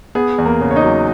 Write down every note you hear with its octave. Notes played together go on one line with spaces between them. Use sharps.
B3 G#4
E2
A#3 A#4
C#3
C#5
D#4 D#5
F#3